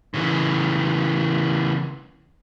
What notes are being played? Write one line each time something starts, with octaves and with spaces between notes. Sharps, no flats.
C#3 E3